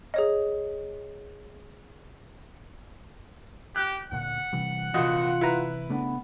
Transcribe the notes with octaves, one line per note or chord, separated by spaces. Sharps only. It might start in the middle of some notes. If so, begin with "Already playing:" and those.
G#4 C#5 D#5
G4 F#6
D2 A#2 D3 F#5
C3 E3 G3
A#1 C3 E3 F4 F#4 D#5
E4 B4 A#5
C#3 A3 B3 D4